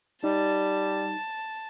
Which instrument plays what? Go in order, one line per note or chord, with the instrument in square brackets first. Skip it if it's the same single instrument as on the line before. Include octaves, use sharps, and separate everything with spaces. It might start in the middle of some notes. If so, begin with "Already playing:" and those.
[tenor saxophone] G3 [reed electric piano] D#4 [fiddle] A5